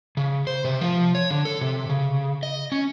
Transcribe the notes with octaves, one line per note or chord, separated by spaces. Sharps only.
C#3
C5
C3
F3
C#5
D3
A4
C3
C#3
D#5
C#4